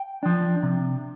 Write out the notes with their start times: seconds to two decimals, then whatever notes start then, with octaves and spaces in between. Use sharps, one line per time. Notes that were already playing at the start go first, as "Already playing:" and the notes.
Already playing: G5
0.23 F3 D4
0.63 C3